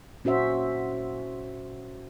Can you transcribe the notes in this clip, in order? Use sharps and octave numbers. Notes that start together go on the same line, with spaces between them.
A#2 C#4 F#4 C5 E5